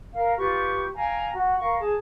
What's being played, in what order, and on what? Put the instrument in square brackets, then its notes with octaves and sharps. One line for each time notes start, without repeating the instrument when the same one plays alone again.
[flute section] A#4 F5
F4 G4 B4 C#6
F5 G5 G#5 A#5
F#4
A#4 F5 C#6
G#4 A5